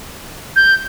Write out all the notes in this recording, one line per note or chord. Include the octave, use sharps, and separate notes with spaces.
G6